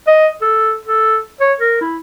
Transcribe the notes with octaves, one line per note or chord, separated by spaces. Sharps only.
D#5
A4
A4
C#5
A#4
E4